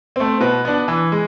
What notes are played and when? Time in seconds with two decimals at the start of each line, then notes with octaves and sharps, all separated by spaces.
0.16 A3 C4
0.40 B2 B4
0.65 B3 D4
0.88 E3
1.12 G#3